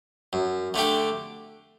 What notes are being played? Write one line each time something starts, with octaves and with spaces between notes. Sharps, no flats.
F#2
D3 A3 D4 G4